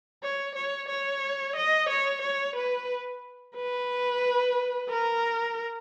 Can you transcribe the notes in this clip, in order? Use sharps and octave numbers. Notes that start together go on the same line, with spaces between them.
C#5
C#5
C#5
D#5
C#5
C#5
B4
B4
A#4